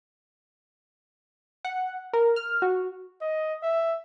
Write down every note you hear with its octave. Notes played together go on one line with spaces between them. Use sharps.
F#5
A#4
F6
F#4
D#5
E5